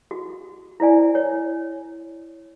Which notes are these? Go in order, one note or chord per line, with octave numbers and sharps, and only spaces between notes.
F#4
E4 C5 D5 G#5
C#5